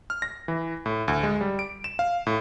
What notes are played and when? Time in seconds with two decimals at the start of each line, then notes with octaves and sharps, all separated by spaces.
0.10 F6
0.22 A#6
0.48 E3
0.86 A2
1.08 D2
1.23 G#3
1.41 G3
1.59 D7
1.84 E7
1.99 F5
2.27 A2